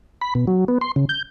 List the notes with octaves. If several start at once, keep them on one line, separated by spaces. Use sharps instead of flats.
B5
B2
F#3
B3
C6
C#3
G6